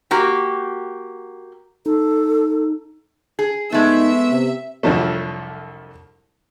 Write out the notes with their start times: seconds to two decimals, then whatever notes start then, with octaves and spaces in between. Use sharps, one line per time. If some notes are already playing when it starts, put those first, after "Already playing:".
0.11 A#3 F#4 G4
1.86 D#4 A4
3.39 G#4
3.72 G#3 A3 B3 D#4 E5
4.30 C3
4.83 C2 F2 D3 F3 F#3 A3